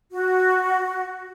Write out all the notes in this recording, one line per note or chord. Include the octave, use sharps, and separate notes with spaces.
F#4